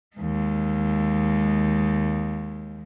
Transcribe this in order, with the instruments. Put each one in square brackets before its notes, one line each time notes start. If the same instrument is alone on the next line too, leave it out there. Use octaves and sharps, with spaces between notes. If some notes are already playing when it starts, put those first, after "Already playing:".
[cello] D#2 G#3